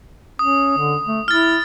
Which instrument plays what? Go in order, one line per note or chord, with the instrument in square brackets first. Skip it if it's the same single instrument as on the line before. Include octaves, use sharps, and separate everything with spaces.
[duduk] C#4 [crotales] D#6
[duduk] D3
A3
[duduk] E4 [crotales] F6 A6